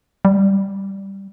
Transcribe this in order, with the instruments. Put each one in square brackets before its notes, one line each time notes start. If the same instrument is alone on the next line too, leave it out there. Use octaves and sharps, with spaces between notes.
[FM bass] G3